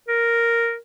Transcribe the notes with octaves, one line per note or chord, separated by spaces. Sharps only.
A#4